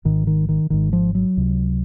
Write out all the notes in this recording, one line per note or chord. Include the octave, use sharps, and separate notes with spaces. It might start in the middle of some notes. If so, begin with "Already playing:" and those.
G#1 G#2 D#3
D#3
D#3
G#1 G#2 D#3
F3
F#3
C#2 C3